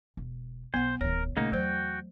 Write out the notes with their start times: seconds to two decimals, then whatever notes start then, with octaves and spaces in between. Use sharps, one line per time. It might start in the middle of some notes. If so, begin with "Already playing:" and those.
0.17 E1
0.74 B1 B3 C5 F#5
1.01 D1 D#3 A#4 C#5
1.37 A#1 C#3 A3 A#3 D#4
1.52 E2 F#3 F#4 C5 G5